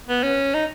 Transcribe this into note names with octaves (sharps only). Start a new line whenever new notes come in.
B3
C#4
D#4